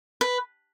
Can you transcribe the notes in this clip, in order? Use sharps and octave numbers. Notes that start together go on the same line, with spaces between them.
B4